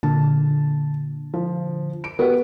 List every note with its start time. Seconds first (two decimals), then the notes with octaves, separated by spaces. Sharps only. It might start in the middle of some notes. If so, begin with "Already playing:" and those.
0.03 A#2 D3 A5
1.34 F3
2.04 D7
2.19 B3 F#4 G4 B4